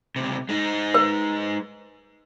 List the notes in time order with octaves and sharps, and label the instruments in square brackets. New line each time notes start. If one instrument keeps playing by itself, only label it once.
[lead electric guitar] C#2 C3
G#3 D#4
[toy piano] B4